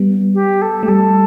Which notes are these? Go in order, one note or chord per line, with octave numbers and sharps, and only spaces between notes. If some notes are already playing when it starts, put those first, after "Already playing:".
Already playing: G3 B3
G4
A4
A3 G4
G3 A4